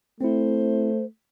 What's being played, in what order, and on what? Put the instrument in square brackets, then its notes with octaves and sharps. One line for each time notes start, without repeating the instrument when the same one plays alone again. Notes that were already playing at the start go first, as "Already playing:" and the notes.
[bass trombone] A3 [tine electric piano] C4 E4 [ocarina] C5